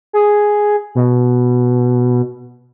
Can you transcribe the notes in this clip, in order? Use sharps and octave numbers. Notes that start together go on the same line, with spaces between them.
G#4
B2